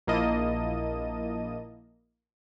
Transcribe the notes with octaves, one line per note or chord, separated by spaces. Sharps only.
A#1 A#3 E4 D#5 A5 D#7